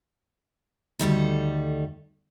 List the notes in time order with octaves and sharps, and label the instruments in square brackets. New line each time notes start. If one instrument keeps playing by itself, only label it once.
[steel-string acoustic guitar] D2 D#3 G3 A4